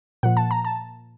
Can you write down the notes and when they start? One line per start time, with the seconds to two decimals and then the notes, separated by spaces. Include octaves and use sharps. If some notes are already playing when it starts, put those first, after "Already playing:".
0.23 A#2 F3 F#5
0.37 A5
0.51 A#5
0.65 A5